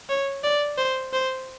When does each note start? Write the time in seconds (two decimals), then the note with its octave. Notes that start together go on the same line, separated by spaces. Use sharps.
0.09 C#5
0.43 D5
0.78 C5
1.13 C5